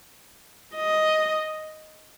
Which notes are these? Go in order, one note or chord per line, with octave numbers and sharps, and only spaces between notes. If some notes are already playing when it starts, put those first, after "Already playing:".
D#5